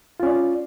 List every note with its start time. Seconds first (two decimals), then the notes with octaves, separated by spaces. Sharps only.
0.20 F4
0.23 C#4
0.26 D5